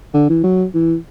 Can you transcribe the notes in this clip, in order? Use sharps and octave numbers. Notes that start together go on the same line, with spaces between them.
D3
E3
F#3
E3